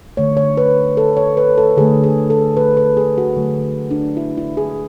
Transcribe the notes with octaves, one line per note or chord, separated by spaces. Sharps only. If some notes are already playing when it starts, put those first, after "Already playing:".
D3 A3 C#5
C#5
B4
A4
C#5
B4
A4
D3 A3 G#4
G#4
A4
B4
B4
G#4
F#4
D3 F#3 A3
D4
E4
E4
G#4